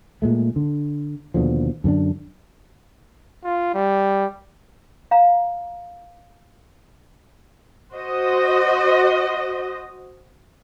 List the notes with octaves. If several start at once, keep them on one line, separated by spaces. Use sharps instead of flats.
A#2 G#3 A3
D3
D#2 B2 D3 F3
F#2 D3 A#3 D4
F4
G3
F5 A#5
F#4 C5 D#5